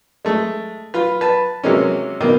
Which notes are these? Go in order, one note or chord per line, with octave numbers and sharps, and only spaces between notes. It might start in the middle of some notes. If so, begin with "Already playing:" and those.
G#3 A3
F4 B4
B4 A5
C3 F#3 G#3 A#3 C#4
B2 D#3 A#3